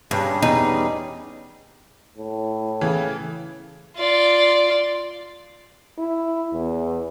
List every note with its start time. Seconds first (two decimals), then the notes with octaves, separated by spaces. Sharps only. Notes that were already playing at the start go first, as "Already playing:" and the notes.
0.11 G2 G3 C#4 G#4
0.42 E2 D#4
2.17 A2
2.81 C#3 E3
3.98 F4 D5
5.98 E4
6.52 E2